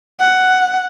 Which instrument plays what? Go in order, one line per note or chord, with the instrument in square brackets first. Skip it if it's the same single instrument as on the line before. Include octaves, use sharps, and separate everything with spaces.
[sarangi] F#5